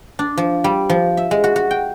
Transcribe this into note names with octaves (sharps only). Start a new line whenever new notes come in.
D4
F3
G3
F3
E5
G#3
F#4
F#4
G5